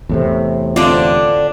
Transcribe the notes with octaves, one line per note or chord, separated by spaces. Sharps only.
E2 A2 C3
D3 C4 D4 F4